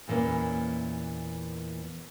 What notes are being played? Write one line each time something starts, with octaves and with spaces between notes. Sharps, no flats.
E2 A#2 E3 A#3 C#4